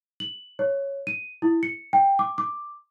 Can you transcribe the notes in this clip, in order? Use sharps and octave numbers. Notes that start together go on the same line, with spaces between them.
F#7
C#5
D#7
E4
C#7
G5
D6
D6